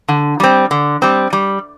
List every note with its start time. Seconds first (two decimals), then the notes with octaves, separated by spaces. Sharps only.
0.08 D3
0.40 G3 C4
0.71 D3
1.02 G3 C4
1.33 G3